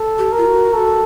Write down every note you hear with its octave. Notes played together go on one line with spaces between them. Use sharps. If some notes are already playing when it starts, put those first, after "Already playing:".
Already playing: A4
G4
A#4
F4
F#4
A4